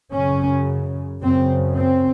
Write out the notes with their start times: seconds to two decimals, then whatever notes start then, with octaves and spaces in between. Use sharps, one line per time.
0.13 F#2 C#3 C#4
1.22 F#2 C#3 C4
1.76 C4